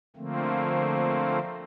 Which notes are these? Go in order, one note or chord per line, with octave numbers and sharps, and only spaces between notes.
D3 F3 A3 A#3 C4